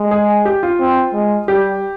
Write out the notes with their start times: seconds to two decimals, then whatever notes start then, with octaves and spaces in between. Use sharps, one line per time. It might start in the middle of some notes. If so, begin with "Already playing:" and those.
Already playing: G#3
0.11 G#4
0.45 G4
0.63 F4
0.80 C4
1.13 G#3
1.48 G3 G4